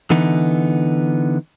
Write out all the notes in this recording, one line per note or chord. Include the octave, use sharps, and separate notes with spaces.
D3 E3 B3 D#4